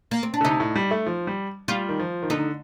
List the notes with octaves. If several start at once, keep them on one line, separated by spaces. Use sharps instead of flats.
A#3
C4
D4
D3
C3 D#4
A2
G3
A3
F3
G3
G3 F4
D#3
F3
D#3
D3 D#4